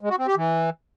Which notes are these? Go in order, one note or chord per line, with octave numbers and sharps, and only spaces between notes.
G#3
F#4
C4
G4
E3